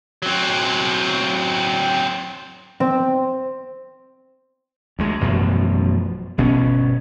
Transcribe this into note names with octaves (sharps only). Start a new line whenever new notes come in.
F#3 C4
C4
D2 G#3
A1 F#2 B2 F3
G1 B2 B3 C#4